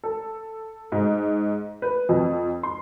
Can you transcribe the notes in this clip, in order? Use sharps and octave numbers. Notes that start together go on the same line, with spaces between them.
A4
G#2
B4
F2
C6